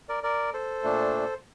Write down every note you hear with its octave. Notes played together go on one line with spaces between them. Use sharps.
A#4 D5
A#4 D5
A4 C5
A#2 A3 D4